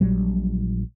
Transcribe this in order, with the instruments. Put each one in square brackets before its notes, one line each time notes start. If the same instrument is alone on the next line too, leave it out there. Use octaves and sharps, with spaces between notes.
[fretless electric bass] A#1 A#2 F#3 G3